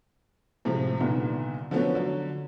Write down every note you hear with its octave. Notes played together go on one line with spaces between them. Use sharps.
A2 C3 F3 G#3
C2 A#2 D3 D#3 B3
D3 F3 F#3 A3 B3 C#4
D3 F#3